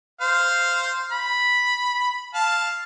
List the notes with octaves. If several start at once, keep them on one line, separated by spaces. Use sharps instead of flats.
C5 F5
B5
F5 A5